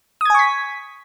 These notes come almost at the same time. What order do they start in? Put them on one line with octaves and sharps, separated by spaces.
D#6 G#6 G#5 C#6 B6